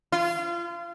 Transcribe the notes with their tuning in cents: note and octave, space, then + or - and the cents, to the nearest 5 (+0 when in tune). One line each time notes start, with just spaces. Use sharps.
F4 -30